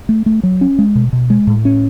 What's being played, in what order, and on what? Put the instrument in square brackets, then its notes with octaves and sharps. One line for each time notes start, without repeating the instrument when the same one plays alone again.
[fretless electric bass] A3
A3
F#3
C#4
G#3
B2
B2
G#3
A2
C#4